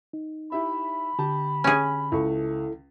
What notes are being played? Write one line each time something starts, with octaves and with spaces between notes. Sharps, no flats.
D#4
E4 G4 E5 B5
D3 G4 A5
C#4 G#4
C#2 E4 A4 C#6